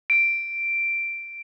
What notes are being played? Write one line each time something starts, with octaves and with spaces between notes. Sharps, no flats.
D7